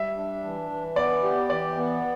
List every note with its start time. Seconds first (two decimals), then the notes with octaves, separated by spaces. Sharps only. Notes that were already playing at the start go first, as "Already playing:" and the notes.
Already playing: G3 E5
0.17 D4
0.44 E3
0.70 E3
0.96 B3 D5
1.23 G4
1.50 E3 D5
1.77 B3